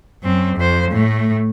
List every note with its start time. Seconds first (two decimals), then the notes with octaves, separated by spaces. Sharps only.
0.23 F#2 C4
0.57 F2 C5
0.91 A2 A3